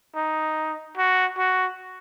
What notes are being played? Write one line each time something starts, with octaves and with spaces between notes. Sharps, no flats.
D#4
F#4
F#4